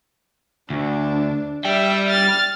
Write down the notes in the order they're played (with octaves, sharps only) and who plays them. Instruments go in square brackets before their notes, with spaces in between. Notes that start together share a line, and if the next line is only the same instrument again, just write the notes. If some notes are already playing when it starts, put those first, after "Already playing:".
[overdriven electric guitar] D2 [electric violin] D4
[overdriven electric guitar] G3 G5 [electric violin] E5
[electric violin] F6 A6